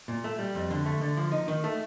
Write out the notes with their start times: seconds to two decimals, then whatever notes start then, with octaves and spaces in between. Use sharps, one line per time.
0.08 A#2
0.24 A3
0.39 G3
0.55 F2
0.71 D3
0.86 A3
1.01 D3
1.17 F3
1.32 D#4
1.48 D#3
1.64 A3